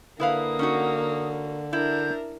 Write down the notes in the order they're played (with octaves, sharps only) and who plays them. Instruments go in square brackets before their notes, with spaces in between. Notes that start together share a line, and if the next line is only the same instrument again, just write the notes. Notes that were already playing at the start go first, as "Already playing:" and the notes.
[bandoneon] D3 [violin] A#3 [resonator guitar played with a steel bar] E4 B4 F5 [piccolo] D#6
[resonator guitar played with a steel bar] C#4 D#4 F#4
[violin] D4 A#4 [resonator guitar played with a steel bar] E4 [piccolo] G6